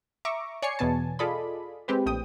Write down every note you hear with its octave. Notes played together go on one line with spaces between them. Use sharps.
E5 A#5 C#6 D6
C#5 D5 G#5 G#6 C7 C#7
E2 B2 B3 G#5 A5
F4 G#4 A4 D5 D#5 B5
G#3 C4 G4 B4
A#1 A2 G5 D#6